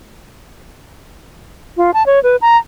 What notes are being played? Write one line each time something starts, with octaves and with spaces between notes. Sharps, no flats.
F4
A5
C#5
B4
A#5